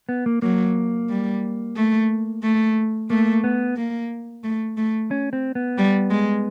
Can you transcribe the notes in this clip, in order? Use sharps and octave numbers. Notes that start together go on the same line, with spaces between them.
B3
A#3
F#3 A#3
G3
A3
A3
A3 A#3
B3
A#3
A3
A3
C#4
C4
B3
G3
G#3